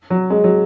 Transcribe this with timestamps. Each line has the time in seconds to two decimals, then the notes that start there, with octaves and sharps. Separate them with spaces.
0.10 F#3
0.30 G#3
0.44 F#3